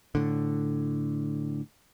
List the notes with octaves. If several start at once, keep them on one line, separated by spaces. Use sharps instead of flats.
A2 D3